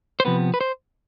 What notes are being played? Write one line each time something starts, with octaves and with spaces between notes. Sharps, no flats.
C5
C3 F3 B3 B4
B4
C5